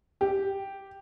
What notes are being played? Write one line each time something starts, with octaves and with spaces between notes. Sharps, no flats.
G4